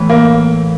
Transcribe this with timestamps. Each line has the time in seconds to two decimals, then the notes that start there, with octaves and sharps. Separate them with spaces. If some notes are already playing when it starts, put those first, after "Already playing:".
Already playing: A2 E3 A3
0.10 A#3